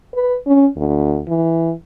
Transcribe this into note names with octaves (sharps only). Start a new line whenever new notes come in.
B4
C#4
D2
E3